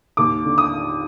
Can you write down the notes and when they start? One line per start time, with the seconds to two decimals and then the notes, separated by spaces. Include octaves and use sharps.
0.17 D#2 D6
0.45 D3
0.58 D#6